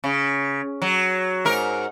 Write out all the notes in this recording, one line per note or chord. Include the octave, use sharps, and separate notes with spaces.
C#3
F#3
G#2 A#4